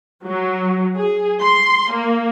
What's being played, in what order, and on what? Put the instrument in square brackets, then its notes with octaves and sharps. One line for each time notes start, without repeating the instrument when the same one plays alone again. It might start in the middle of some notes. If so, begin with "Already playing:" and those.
[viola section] F#3
G#4
C6
A#3